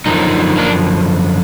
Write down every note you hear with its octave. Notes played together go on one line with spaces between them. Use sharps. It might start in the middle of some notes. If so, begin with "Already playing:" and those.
F#2 D3 F3 D#4
A#3 D4